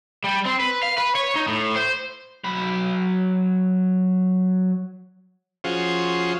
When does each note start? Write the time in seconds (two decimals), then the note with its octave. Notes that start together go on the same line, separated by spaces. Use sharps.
0.24 G3
0.45 C4
0.60 B4
0.83 F5
0.98 B4
1.15 C#5
1.36 D#4
1.48 A2
1.76 C5
2.44 F#3 B5
5.64 F3 C#4 F4 F#4 G#4 C5